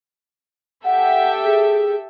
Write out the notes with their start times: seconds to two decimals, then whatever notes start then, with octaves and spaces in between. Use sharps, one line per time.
0.85 G4 A4 E5 F#5
1.45 G#4